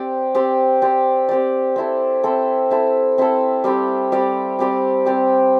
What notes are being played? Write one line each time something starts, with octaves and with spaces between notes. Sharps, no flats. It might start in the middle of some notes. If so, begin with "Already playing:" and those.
Already playing: C4 G4 D5
C4 G4 D5
C4 G4 D5
C4 G4 D5
C4 E4 A4
C4 E4 A4
C4 E4 A4
C4 E4 A4
G3 C4 G4 D5
G3 C4 G4 D5
G3 C4 G4 D5
G3 C4 G4 D5